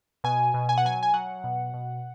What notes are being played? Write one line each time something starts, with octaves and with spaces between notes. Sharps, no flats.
B2 G#5
B2
G#5
F#5
F#3 G#5
G#5
F#3 F#5
B2
B2